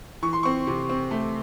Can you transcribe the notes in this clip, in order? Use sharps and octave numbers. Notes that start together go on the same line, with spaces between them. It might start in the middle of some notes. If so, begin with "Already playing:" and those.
E3 C#6
C6
C4 C#6
C3
C4
A3